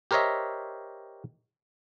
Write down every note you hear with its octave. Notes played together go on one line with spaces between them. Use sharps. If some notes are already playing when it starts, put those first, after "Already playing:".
G4 A#4 C5 C#5 D#5 E5